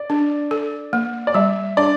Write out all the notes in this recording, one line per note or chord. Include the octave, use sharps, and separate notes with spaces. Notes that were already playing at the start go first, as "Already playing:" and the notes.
Already playing: D5
D4
A4
A#3
D5
G3 E5
D4 D5